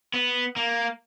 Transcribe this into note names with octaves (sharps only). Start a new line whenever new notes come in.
B3
A#3